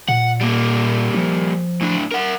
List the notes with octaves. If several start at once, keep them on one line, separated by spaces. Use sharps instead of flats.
A#2 F#5
G3 A#3
F3
A2 D4
A#4 F#5